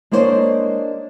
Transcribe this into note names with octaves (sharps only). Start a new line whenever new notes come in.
G#3 A#3 D4 C5 C#5 D#5